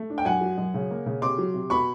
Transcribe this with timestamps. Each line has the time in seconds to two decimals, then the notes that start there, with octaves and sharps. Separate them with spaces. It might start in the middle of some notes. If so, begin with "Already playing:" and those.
Already playing: A3
0.10 D4
0.18 G5
0.25 F#2 F#5 G#5
0.41 F#3
0.58 F#2
0.74 C#3
0.91 A#3
1.06 C#3
1.22 C3 C6 D6
1.38 F#3
1.54 C3
1.70 B2 B5 C#6